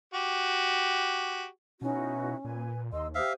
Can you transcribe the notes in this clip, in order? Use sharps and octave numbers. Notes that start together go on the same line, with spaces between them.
F#4 G4
B2 C#4 D#4 E4 F#4
A#2 B4 G#5
D#2 D#4 D#5 C6 E6
G4 C5 E5 F5 G5 D#6